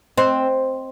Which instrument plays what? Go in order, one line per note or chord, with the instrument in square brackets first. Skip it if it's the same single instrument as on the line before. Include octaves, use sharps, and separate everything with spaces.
[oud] C4 [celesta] C5 D#5 C6